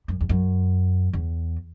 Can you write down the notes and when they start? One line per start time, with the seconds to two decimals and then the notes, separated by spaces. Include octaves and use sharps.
0.08 F#2
0.21 E2
0.29 F#2
1.13 E2